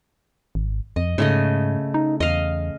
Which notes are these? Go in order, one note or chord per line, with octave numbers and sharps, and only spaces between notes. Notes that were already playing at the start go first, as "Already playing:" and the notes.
G#1
F2 D#5
G#2 C#3 A3 D#5
D#4
E2 D#5 F5